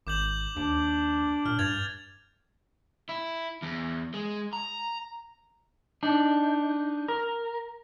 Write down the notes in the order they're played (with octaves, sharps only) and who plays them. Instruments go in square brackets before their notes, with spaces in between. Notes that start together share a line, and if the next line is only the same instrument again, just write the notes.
[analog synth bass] G#1 [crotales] D6 G6 F#7
[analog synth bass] D#2 [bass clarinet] D4
[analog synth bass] A#2 [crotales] F6
[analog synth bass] G2 [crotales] G#6 A6 F7
[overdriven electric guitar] E4
E2
G#3
A#5
[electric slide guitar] D4 D#4
A#4